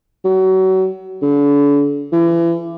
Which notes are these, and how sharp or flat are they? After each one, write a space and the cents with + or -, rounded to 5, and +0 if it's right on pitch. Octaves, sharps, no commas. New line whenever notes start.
F#3 +30
D3 -40
E3 +35